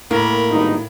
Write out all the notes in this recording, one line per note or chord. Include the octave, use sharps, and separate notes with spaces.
A2 A#3 A#4 B5
G#1 G2 D#4